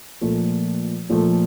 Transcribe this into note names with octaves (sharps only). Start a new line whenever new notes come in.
A#2 F3 A3
A#2 F3 A3